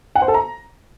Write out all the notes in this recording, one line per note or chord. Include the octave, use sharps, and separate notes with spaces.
F#5
C5
A4
A#5